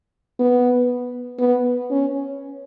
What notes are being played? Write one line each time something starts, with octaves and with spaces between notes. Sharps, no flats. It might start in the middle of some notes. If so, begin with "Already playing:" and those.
B3
B3
C#4